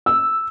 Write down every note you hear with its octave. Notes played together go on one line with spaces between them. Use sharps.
E6